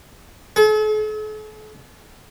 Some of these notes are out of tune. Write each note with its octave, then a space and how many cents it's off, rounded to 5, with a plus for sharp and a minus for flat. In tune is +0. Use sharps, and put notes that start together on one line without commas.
A4 -45